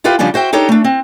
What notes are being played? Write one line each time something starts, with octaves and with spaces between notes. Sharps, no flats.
E4 F4 G4 B4 F5
C#3 F3 G3 C#4 D4 F4
F#4 C5 E5 G5
D4 D#4 G4 A4 C#5
A3 D4
C4